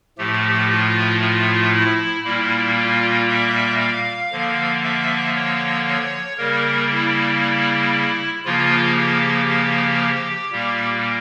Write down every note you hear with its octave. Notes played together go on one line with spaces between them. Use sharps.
A2 F3 A3 G4
F4
F4
E4
A#2 G3 A#3 E4
F4
E5
F5
D3 F3 A#3
E5
C#5
C#5
C#3 G3 A#3 A#4
E4
C#3 F3 A#3 F4
G4
G4
A#2 G3 A#3